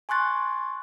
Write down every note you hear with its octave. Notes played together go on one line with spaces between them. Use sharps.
G#5 C6 C#6 F#6 A6